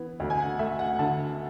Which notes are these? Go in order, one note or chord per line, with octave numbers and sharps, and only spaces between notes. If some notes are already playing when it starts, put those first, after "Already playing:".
Already playing: E3 B3
D2
G#5
F#5
A3 E5
F#5
D3 A5